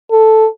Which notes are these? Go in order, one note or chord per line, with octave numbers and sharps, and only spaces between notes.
A4